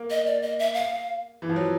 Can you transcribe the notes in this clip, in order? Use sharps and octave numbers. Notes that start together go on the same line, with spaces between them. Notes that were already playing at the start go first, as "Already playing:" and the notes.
Already playing: A#3
D#5
D5
D#5
E5
F5
E3
F3
F#3